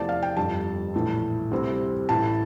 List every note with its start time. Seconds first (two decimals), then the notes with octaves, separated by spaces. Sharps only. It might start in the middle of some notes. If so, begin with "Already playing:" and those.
Already playing: E2 C3 F3 A3 D5 A5
0.09 F5
0.23 G5
0.36 G1 F2 D3 G3 A5
0.94 A#1 A2 E3 A3
1.51 D2 C3 G3 C4 E4
2.09 A1 A2 E3 A3 E4 A5